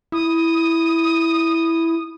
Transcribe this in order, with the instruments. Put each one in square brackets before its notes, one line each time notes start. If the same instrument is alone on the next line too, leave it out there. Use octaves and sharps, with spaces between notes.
[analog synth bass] E4 [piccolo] D#6